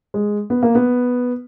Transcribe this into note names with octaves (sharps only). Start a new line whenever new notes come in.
G#3
B3
A#3
B3